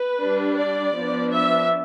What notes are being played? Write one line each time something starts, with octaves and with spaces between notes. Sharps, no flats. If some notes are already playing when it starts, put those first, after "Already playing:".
Already playing: B4
G3 D4
D5
F3 B3 D4
E5